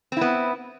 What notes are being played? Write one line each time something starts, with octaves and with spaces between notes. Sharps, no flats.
B3 C4 E4